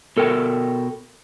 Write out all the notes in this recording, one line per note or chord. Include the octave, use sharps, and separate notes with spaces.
B2 A4 A#4 G5